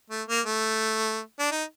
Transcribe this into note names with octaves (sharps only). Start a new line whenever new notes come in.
A3
A#3
A3
D4
D#4